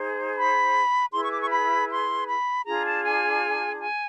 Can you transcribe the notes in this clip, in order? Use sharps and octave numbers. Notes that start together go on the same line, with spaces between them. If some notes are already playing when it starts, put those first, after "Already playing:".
Already playing: D#4 G#4 C5
B5
E4 G#4 B4 C6
C#6
D6
C#6
B5
C6
B5
D4 F4 G#4 A#5
A5
G#5
G#5